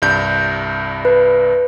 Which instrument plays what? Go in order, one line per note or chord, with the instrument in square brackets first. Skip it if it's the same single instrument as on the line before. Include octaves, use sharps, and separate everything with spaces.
[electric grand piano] C2 G2 G6
[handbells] B4